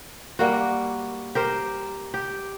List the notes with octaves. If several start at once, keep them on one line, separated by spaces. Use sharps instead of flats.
G3 A#3 F#4
G4 A#4 C5
G4